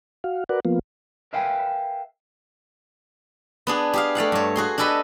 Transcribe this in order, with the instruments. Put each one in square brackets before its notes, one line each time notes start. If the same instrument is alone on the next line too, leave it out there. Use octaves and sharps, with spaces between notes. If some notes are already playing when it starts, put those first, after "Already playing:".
[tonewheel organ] F#4 F5
F#4 A#4 B4 D5 F#5
F3 A#3 B3 F4
[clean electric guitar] A#4 B4 E5 F5 G5 G#5
[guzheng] B3 D4 G#4
G4 G#4 F5
A3 D5 F5 F#5
G2 C#5
F#4 G#4 C6
D4 G4 A4 B4 D#5